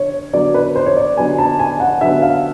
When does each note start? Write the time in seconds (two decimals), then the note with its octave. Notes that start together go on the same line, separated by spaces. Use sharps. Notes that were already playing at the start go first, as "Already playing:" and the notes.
Already playing: D3 C#5
0.33 D3 F#3 B3 D5
0.54 B4
0.76 C5
0.86 C#5
0.97 D5
1.17 D3 F#3 B3 G#5
1.38 A5
1.59 G#5
1.80 F#5
2.01 D3 F#3 B3 E5
2.22 F5